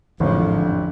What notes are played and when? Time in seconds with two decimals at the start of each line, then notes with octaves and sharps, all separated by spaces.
0.20 A1 F2 G#2 D3 F3